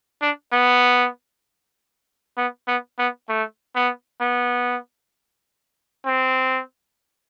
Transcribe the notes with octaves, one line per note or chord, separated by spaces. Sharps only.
D4
B3
B3
B3
B3
A3
B3
B3
C4